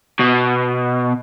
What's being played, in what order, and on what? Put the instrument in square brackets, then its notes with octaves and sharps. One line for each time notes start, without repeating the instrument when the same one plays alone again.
[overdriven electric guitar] B2